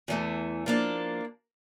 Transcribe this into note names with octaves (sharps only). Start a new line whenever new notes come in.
E2 E3 A3
F3 A#3 D4